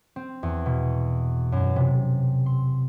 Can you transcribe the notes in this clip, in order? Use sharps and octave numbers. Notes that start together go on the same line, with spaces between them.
C4
E2
B2
F#2
C3
C6